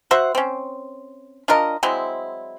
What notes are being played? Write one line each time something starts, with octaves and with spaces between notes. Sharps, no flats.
F#4 C5 E5 F#5
C4 C#4
D4 F4 A#4 D#5
F#3 G#3 C4 E4